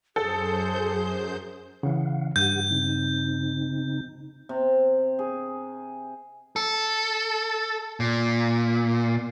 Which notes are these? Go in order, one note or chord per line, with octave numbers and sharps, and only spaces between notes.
F#2 G#4 A4 C5 G6
C#3 E3 F5 F#5
G2 G4 F#5 G6
C#3 C4 D#4
C3
G#4
A4
A#2